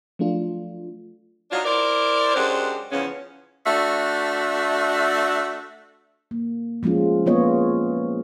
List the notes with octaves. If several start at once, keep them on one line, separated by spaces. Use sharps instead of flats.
F3 F#3 A3 D4 F4
F#3 D4 D#4 F4
E4 A#4 C5 D5
F#2 F#3 G#3 D4 G4 C5
E2 C#3 F3 B3 C#4
A3 D4 F#4 E5
A#3
F3 G#3 A3 C#4 F4
F#3 A#3 B3 F4 C#5 D#5